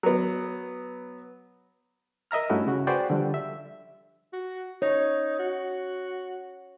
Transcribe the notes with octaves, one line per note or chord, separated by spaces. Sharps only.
F#3 B3
A#4 D#5 E5 A#5 F6
G2 A3 C#4 E4 F#4
C#3 F#4
F#4 G#4 B4 C5 D5 G5
D3 F3 G3
E5
F#4
D#4 C#5
F#4